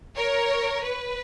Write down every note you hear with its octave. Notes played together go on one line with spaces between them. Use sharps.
A#4 C#5
B4